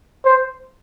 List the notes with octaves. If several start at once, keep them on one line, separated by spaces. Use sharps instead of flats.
C5